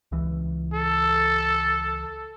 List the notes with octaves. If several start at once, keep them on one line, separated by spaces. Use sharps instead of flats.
C#2 E3
A4